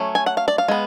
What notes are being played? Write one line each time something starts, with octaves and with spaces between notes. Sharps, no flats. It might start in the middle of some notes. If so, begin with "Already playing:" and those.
Already playing: F#3 A3 C#4
G#5
F#5
F5
D5
F5
G#3 B3